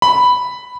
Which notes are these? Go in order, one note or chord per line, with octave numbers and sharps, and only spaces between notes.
B5